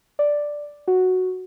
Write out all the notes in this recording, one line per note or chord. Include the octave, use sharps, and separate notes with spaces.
D5
F#4